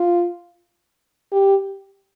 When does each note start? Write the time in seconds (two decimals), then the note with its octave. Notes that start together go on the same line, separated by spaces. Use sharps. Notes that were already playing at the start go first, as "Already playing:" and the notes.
Already playing: F4
1.32 G4